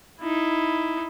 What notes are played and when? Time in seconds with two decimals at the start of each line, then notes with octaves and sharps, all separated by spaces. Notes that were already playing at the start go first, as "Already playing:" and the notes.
0.20 D#4 E4